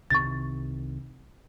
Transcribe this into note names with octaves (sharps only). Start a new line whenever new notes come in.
C2 C3 D#3 C#6 A6